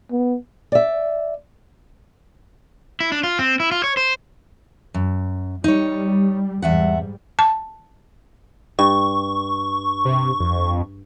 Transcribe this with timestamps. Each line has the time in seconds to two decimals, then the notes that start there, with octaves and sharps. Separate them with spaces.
0.11 B3
0.72 D5 E5
3.00 E4
3.12 D4
3.23 F4
3.39 C4
3.60 E4
3.71 F4
3.84 C#5
3.97 C5
4.94 F#2
5.64 G3 D#4 C#5
6.62 E2 G#2 G3 E5 F#5
7.39 A5
8.79 G2 C#6
10.05 C3
10.40 F2